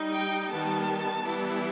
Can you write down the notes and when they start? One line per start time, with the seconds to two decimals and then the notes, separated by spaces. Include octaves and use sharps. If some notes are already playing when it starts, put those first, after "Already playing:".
Already playing: G3 D#4
0.15 G5
0.51 D#3 G3 B3 A5
1.23 E3 G3 B3 E4